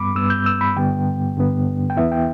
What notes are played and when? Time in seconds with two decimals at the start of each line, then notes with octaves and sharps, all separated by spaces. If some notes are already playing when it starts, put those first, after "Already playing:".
Already playing: G2 G3 B3 B5 D6
0.15 G2 G3 B3 E6
0.30 G6
0.46 E6
0.61 B5
0.76 G2 D3 G3 B3 G5
1.37 G2 D3 G3 B3
1.90 G5
1.97 E2 E3 B3 E4 E5
2.12 G5